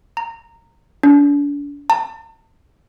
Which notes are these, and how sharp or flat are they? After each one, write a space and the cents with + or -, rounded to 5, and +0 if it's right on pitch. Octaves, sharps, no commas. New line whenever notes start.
A#5 -15
D4 -40
A5 +35